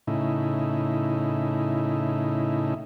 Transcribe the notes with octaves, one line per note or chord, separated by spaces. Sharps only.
A2 C#3 D#4 E4